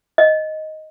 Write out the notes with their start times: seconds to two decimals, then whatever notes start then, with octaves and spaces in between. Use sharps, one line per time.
0.18 D#5